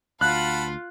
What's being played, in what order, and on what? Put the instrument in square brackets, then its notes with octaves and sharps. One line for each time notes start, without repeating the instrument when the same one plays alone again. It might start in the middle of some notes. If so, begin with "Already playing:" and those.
[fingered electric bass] D2 [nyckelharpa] F4 F5 [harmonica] F#5 A5 B5 [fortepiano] F#6